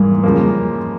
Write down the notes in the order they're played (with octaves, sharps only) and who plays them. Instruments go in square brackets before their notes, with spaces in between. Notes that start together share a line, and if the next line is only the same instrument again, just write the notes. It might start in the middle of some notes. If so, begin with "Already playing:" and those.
Already playing: [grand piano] G#2 E3 A#3 [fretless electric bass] G3
[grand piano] C#3 F3 A#3